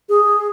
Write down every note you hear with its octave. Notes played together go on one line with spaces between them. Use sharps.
G#4